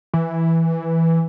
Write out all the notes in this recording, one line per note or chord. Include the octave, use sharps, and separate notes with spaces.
E3